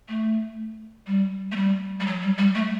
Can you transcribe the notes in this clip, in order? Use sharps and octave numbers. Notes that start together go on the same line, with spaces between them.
A3
G3
A3
G3
G3
F#3
G3
G3
A3